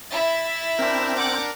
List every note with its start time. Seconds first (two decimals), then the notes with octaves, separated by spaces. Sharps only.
0.11 E4 A6
0.79 C4 D4 A#4
1.17 F#5 D6